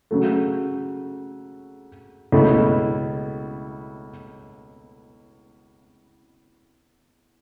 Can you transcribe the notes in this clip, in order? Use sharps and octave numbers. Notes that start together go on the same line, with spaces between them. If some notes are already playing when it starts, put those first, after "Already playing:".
C#3 F#3 A3
C#2 B2 A3 E4